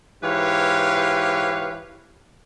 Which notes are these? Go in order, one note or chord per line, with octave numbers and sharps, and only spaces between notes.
G#2 E3 G4 B4 C#5 F5